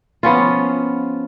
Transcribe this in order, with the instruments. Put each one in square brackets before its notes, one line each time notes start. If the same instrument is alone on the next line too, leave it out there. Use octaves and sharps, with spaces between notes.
[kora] F3 B3 C#4 F4